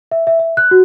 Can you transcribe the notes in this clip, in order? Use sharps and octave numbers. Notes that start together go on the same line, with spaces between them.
E5
E5
E5
F#6
F#4